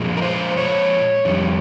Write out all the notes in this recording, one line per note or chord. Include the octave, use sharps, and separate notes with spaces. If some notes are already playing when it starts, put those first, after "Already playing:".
Already playing: A#2 F3 G#3
A#4
C5
C#5
F2 D#3 G3